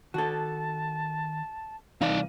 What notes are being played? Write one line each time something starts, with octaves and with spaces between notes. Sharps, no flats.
D#3 F#4 A4 F#5 A5
C2 B2 E3 A3 C4 D#4 D5 F5